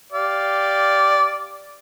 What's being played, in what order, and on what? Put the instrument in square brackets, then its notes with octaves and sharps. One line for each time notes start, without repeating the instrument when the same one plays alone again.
[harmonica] G4 D5 F5